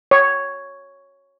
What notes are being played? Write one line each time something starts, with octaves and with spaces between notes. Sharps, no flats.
C#5